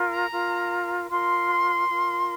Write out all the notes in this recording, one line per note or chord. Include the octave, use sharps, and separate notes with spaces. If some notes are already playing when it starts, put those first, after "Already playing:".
Already playing: F4 A#4
A#5
F4 A#4
F4 A#4 C6
F4 A#4